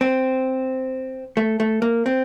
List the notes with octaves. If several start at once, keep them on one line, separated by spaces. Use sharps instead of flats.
C4
A3
A3
A#3
C4